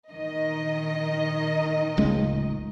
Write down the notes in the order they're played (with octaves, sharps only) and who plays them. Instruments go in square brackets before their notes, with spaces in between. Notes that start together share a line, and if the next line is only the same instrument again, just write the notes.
[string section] A#1 D#3 D#5
[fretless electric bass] D1 C#2 G#3